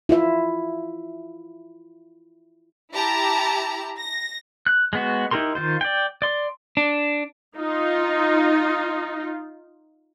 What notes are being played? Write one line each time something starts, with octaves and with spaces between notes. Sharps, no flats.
E4 F4 E5
E4 G4 A5 A#5
A#6
F#6
G#3 B3 F#4
D#4 E4 G4 A#4 C6
D#3 F4 C5
D5 G5
D5 C6
D4
D#4 F4